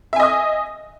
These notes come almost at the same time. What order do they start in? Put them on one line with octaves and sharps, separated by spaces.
E5 G#5 D#5 D#6